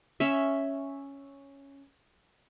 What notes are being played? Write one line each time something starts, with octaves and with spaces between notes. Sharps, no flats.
C#4 E5